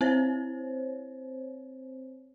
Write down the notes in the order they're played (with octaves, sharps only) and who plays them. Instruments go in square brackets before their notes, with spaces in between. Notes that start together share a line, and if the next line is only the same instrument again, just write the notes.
[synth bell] C4 C5 C#5